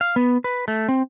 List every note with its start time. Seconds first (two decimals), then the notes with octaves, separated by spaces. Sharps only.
0.01 F5
0.16 B3
0.44 B4
0.68 A3
0.88 C4